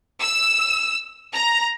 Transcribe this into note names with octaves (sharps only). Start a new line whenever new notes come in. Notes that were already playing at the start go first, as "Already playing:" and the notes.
E6
A#5